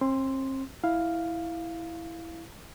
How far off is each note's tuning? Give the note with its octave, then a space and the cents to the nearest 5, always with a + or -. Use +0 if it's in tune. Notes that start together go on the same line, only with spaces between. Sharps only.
C4 +40 C6 +0
E4 +0 F5 +0